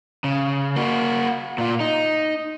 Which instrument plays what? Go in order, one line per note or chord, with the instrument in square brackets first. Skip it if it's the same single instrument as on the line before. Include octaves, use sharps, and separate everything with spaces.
[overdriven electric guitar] C#3
A#3 F#4
A#2 F4
D#4